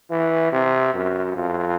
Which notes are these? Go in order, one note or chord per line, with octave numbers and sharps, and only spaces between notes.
E3
C3
F#2
F2